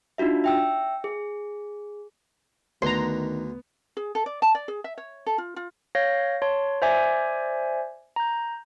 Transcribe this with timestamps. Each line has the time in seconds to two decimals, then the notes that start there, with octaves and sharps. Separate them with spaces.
0.18 D4 D#4 F4 F#4 E5
0.44 E5 G5 E6
1.04 G#4
2.82 D2 D#3 B3 A#5 C6
3.97 G#4
4.15 A4
4.26 D5
4.42 A5
4.55 D5
4.68 G#4
4.84 E5
4.98 C#5
5.26 A4
5.38 F4
5.56 F4
5.95 C#5 F5 G6 A#6
6.42 C#5 A5 C6
6.82 C5 D5 E5 G#5 D6 G#6
8.16 A#5 G6